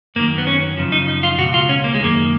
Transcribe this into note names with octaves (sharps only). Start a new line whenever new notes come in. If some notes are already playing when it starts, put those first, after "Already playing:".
F#2 D#3 A#3
B3
C#4
F#2 C#3 F3
D#4
D#4
F4
C#2 B2 F#4
F4
C#4
A#3
G#3
F#2 D#3 A#3